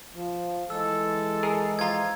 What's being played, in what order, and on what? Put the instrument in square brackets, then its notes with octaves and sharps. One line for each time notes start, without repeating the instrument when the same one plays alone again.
[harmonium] F3
[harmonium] E3 G#3 [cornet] A4 [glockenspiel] E6
[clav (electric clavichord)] G#4 A#4
[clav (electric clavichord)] F3 F4 [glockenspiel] A#5 G#6